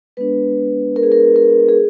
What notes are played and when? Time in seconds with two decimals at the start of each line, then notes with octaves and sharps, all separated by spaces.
0.17 G#3 B3 D4 B4
0.96 A#4
1.03 G#4
1.12 A#4
1.36 A#4
1.69 G#4